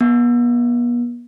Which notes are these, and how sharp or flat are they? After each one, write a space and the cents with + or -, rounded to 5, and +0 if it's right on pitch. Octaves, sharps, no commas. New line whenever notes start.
B3 -40